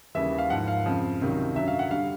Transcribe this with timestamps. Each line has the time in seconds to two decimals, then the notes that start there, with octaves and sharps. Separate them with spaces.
0.15 D#2 C#3 E3 G3 E5
0.38 F5
0.50 G#2 F3 F#5
0.68 F5
0.86 F2 C#3 F3
1.21 C#2 C3 D#3 F#3
1.56 F#2 D3 F#3 E5
1.68 F5
1.79 F#5
1.91 D3 G3 F5